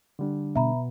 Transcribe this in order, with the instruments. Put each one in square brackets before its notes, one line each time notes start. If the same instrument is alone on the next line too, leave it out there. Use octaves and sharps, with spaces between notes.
[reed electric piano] D3 G3 D4
[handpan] B2 B3 [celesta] E5 A#5 B5